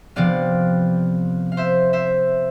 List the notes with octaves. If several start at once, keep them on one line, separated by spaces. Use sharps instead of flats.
C3 F3 B3 D5 F5
F5
C5 E5
C5 E5